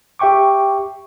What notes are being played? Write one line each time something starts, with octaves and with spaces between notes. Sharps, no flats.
G4 E5 G5 C#6 D6